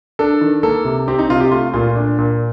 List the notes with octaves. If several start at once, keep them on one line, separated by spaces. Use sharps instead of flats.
D4 A4
D#3
A#3 A4
C3
C4 G4
D#4
C3 F4
G4
A3 F4
A#2 F4
D4
A#2